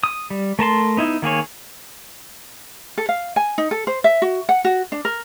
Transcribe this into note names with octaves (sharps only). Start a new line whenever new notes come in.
D#6
G3
A3 A#4 A5 C6
B3 D#4 E4
D#3 A#3 G#4 C#5
A4
F5
G#5
D#4
A4
C5
E5
F#4
F#5
F#4
D4
A#4